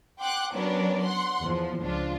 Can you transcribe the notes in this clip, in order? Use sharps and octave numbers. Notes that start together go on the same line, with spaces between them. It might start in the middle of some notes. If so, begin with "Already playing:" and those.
F#5 G5 C6 D6 F#6
F#3 B3 C#4 D4 A#4 D5
F#5 C6
E2 F3
C#2 F3 D4 F4